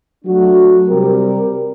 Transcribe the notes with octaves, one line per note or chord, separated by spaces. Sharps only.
F#3 A3 D4 F#4
C3 G3 C4 G4 A#4